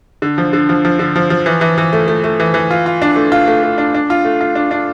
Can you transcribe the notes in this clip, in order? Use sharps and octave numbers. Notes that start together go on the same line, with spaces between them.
D3
F3
D3
F3
F3
D3
F3
F3
E3
E3
E3
A3
A3
A3
E3
E3
F4
F4
D4
A3
F4
A3
A3
D4
D4
F4
A3
F4
D4
D4